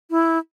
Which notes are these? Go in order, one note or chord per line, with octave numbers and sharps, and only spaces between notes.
E4